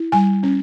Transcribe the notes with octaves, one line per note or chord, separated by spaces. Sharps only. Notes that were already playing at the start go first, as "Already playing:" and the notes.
Already playing: E4
G3 G#5
C#4